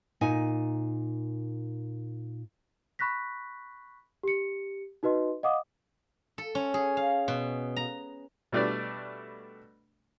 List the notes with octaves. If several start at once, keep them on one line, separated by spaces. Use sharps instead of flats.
A#2 D#4 G#5
B5 C#6 F#6 A#6 B6
G4 C#7
D#4 F#4 B4 D#5 C6
D#5 F5 F#5 D6 D#6
A4
C#4
G#4
F5
B2
A#5
B2 G3 A3 D4 B4 D5